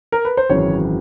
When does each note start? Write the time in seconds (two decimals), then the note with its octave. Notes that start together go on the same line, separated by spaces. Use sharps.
0.12 A#4
0.25 B4
0.37 C5
0.50 G#1 F#2 C#3 E3 C#5